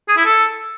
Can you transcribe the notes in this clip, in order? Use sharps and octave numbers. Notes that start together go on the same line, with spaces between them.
G#4
E4
A4